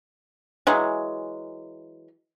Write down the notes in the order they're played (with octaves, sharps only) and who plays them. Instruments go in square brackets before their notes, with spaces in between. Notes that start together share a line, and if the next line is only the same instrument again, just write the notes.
[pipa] E3 F#3 G#3